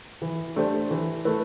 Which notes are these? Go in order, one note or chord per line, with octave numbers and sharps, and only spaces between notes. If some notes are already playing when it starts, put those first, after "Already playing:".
E3
A3 D4 G4 C5
E3
A3 E4 B4